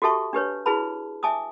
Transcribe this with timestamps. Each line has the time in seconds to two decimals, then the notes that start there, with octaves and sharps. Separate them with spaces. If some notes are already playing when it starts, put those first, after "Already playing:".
0.02 F#4 G4 A4 E5 A5 C#6
0.33 D4 G4 B4 C#5
0.66 E4 F#4 G#4 B4 A5 B5
1.23 E5 G#5 A5 D6 D#6